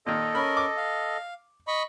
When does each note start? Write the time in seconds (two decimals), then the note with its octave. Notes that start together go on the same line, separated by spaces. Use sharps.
0.06 A#2 D#3 A4 D#5
0.35 C#4 A#4 B5
0.57 D6
0.77 F5
1.68 D#5 B5 C#6